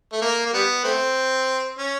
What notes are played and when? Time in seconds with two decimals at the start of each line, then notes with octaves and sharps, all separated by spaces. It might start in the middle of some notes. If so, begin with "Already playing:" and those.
0.12 A3
0.22 A#3
0.46 A#3
0.54 G3 B3
0.84 A3 C4
1.78 C#4